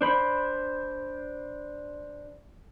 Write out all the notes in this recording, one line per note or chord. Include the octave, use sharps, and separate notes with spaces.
D4 C5 B5